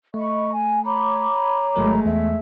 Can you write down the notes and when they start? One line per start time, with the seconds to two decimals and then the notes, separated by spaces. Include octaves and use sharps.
0.14 A3 D#5 B5 C#6
0.51 G#5
0.85 C#5 A#5 B5 D6
1.76 G#1 F#3 G#3 A3 A#4
2.06 E2 E5